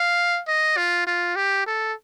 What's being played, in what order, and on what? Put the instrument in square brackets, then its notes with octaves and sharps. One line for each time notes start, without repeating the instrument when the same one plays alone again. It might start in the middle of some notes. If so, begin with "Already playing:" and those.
Already playing: [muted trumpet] F5
D#5
F4
F4
G4
A4